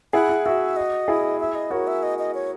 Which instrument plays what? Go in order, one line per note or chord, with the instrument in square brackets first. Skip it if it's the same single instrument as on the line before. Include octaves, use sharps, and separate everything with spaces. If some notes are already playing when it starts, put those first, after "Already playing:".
[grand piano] E4 G#4 [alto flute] F#5
[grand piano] E4
[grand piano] F#4 [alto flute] E5
[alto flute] D#5
[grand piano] E4 G#4
[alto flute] E5
D#5
[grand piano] F#4 A#4 [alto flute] C#5
[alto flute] E5
D#5
D#5
C#5